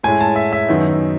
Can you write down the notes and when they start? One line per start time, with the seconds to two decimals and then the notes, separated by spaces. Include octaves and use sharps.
0.03 A2 G#3 C#4 E4 G#5
0.20 A5
0.36 E5
0.53 E5
0.68 F#2 D#3 F#3 B3 D#4